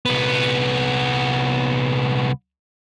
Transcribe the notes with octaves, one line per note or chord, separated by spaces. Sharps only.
C2 B3